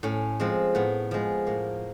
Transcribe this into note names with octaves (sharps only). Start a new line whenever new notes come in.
A2 C#4
F3 G#3 C4
A2 B3
F3 G#3
A2 A#3